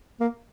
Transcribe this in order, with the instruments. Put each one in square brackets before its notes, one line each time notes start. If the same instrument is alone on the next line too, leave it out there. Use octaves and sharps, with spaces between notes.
[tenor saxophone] A#3